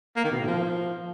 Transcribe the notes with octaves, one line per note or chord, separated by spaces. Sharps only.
A#3
D#3
B2
A2
F3